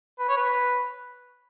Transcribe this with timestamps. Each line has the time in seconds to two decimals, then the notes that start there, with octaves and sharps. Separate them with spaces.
0.19 B4
0.29 C#5
0.37 B4